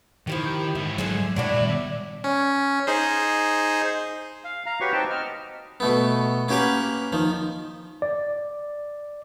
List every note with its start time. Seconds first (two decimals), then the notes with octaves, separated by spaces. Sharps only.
0.27 D#3 F3 E4 G4
0.75 G#2 E4 E5
0.98 D3 F#3 G#4 C5
1.36 G2 A#2 G#3 D4 E4 F#4 C#5 D5
1.60 D#3 G3 B3
2.24 C#4
2.87 D#4 G#4 C5
4.44 F5
4.66 F5 A#5
4.81 F#4 G4 B4 C#5 C#6
4.92 C4 D#4 G5 A5
5.10 D#5 F6
5.80 B2 A3 B3
6.48 A#3 C#4 F#4 G4 A#4 B4
7.13 D#3 F3
8.02 D5